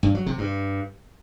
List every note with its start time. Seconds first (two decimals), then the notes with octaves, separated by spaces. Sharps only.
0.03 G2
0.15 F#3
0.26 C3
0.38 G2